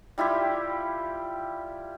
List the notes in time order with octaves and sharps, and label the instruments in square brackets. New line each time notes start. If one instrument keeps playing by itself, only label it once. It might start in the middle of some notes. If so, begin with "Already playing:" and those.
[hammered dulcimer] G3 E4 F4 G4